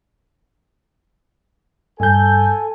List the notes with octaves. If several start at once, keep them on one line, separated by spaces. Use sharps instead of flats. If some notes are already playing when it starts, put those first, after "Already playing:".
G2 A4 G#5 G6